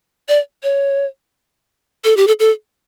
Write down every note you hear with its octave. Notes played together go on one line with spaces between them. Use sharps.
D5
C#5
A4
G4
A4
A4